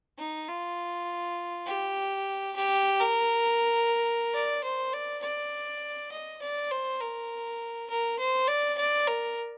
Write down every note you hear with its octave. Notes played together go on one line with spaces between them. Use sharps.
D#4
F4
G4
G4
A#4
D5
C5
D5
D5
D#5
D5
C5
A#4
A#4
C5
D5
D5
A#4